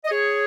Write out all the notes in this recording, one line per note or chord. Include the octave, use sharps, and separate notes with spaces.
D#5
G#4 C#5